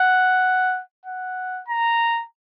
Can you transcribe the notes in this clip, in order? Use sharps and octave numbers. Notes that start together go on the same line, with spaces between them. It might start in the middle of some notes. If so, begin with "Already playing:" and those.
Already playing: F#5
F#5
A#5